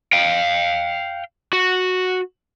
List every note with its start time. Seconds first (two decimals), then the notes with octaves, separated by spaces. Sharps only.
0.13 F5 G5
1.53 F#4